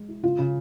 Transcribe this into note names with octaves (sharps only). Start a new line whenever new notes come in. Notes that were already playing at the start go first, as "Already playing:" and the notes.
Already playing: G#3
E4
C#3 F4
C#3